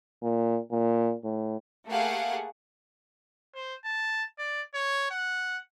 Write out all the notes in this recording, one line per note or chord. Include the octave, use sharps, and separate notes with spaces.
A#2
A#2
A2
A3 A#3 G4 G#4 F5 F#5
C5
A5
D5
C#5
F#5